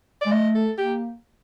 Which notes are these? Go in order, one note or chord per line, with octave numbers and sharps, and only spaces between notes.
D5
G#3
A3 D#5
A4
A#3 G4